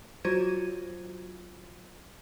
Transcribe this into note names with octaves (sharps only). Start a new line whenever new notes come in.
F#3 F4 F#4 C5 G#6 D#7